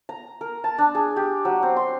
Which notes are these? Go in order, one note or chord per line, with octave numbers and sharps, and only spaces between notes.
A#5
A#4
A5
D4
G#4
G4
F#3
C4
C6